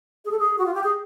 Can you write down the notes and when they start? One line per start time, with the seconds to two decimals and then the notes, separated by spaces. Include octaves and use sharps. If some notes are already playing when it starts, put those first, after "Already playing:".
0.25 G#4
0.31 A4
0.39 G#4
0.58 F#4
0.66 F4
0.74 G4
0.83 G#4